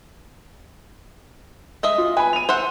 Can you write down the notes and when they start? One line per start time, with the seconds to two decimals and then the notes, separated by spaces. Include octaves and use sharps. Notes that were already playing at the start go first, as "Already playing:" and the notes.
1.83 G#3 D#5 E5
1.98 F4
2.17 B4 G#5 B5
2.33 D#7 F7
2.49 C5 E5 F#5